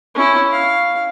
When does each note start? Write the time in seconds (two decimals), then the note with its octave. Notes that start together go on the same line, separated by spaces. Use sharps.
0.15 C#4 E4
0.52 F5